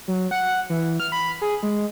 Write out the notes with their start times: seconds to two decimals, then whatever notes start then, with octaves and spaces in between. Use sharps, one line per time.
0.08 F#3
0.31 F#5
0.70 E3
1.00 F6
1.12 B5
1.41 G#4
1.63 G#3